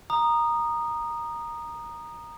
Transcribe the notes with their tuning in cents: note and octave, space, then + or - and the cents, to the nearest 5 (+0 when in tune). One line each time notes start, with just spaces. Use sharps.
A#5 +5 D#6 -15